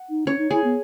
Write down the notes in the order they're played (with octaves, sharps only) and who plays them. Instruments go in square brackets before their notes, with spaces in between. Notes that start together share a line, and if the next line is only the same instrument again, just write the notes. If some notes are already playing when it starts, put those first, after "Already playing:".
Already playing: [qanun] F#5
[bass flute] D#4
[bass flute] C#4 [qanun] C#5
[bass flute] D#4
[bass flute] E4 [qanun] G#4
[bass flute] B3